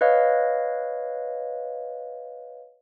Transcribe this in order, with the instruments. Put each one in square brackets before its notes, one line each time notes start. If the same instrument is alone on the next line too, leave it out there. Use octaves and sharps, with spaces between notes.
[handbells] B4 C#5 D#5 F5